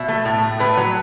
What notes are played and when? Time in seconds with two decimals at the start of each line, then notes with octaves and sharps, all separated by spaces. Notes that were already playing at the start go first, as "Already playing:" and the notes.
Already playing: B2 E5
0.08 A3
0.25 A2
0.43 A3
0.59 A2 B4
0.77 F#3